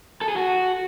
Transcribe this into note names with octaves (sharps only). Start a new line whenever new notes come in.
A4
G#4
F#4